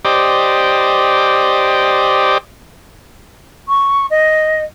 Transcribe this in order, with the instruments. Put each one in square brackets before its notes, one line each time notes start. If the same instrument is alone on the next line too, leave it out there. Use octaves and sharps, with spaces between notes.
[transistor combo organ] G4 C5 D5 D#5
[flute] C#6
D#5